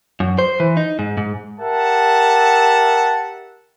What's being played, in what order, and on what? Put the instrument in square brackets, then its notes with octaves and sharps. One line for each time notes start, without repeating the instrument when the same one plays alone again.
[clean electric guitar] F#2
C5
E3
D#4
G#2
G#2
[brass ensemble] G4 A#4 E5 F#5 A5